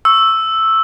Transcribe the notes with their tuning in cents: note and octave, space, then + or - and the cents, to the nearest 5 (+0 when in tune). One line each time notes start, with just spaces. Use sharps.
C#6 +0 E6 +0